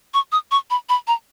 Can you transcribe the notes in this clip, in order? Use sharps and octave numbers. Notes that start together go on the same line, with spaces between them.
C#6
D#6
C#6
B5
B5
A#5